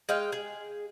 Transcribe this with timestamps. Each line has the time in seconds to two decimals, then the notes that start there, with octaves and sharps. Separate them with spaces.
0.09 G#3 D#5 F5 G5
0.32 G#4